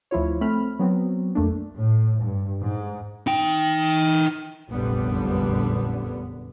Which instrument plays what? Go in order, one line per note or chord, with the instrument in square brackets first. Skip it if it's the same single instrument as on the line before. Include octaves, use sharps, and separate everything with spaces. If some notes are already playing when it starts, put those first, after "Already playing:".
[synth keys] D2 F3 E4 F4 C#5
A3 C4 B5 F6
F#3 B3 C4 F#4
B1 F2 A3 A#3 D4
[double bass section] A2
G2
G#2
[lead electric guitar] D#4 G5
[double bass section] F1 A#1 F#2 D3 G3 B3